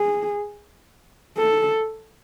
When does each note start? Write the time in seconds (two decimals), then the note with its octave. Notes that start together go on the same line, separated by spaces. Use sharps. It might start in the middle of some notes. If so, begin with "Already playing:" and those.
Already playing: G#4
1.38 A4